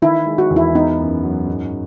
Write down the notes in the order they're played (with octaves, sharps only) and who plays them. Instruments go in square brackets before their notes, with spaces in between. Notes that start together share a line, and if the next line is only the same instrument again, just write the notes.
[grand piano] D#3 [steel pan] E4
[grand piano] G#3
[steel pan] F#4
[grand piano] E2
[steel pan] E4
[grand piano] B3 [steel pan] D#4
[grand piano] F#2
F#3
G#2